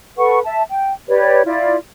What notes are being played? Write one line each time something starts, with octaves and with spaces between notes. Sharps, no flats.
A4 B4 F#5 C#6
E5 A5
G5
G4 B4 C#5 D5
E4 F4 D5